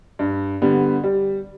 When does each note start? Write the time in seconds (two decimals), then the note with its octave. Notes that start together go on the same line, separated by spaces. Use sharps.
0.19 G2
0.62 D3 G3 B3
1.03 G3